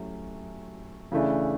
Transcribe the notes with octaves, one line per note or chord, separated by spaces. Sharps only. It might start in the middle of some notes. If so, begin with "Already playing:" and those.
Already playing: F#3 A3 C#4 E4 G4
C#3 E3 A3 D4